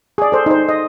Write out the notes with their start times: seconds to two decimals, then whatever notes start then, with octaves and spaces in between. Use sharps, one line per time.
0.18 G#4 D5
0.32 A4 C5
0.46 D#4 C5
0.69 D#5